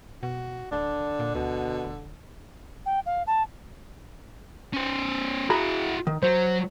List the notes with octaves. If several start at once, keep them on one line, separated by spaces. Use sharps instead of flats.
B2 F#4
D1 D3 D4
A#2
D2 B2
D1
G5
F5
A5
C#4 C5
E4 F#4 G#4 A#5 B5
D#3
F#3 C5